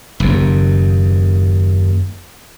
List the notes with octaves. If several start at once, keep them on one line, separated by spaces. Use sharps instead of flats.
F#1 D#2